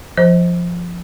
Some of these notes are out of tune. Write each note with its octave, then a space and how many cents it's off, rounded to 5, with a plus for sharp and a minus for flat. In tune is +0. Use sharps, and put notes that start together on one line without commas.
F3 +0 C5 +0